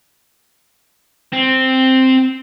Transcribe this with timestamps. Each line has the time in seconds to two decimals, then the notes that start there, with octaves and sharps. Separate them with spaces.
1.33 C4